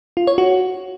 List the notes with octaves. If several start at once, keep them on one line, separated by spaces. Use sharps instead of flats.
F4
C#5
F#4